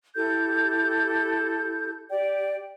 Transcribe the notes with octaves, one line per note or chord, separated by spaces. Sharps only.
E4 G4 A4 G6
G4 D5 G5